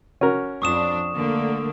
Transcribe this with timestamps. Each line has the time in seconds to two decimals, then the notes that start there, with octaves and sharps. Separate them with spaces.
0.21 C#4 F#4 A#4
0.62 F2 D4 C#6 D#6 E7
1.14 D3 A3 A#3